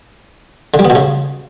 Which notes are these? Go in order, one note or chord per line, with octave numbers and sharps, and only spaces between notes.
D3
G3
B3
B2
C#3